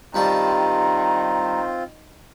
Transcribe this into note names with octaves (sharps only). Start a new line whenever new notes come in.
G2 D#3 G3 C4 F4 A5 A#5